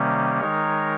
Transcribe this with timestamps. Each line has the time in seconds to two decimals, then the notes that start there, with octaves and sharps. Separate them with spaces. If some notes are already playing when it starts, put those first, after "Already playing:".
Already playing: C3 D#3 G3 A#3 C#4
0.40 D#3 G#3 D#4 A#4 C#5